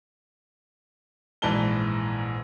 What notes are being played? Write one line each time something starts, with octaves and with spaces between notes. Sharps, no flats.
A#1 G#2 E3 D5 A5 G7